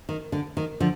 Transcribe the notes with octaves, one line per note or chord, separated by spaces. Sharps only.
D#3
D3
D#3
D3 F3